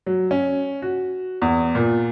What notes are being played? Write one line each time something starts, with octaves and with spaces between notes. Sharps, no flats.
F#3
C#4
F#4
E2
A#2